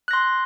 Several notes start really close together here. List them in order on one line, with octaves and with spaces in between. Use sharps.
F#6 A#6 C6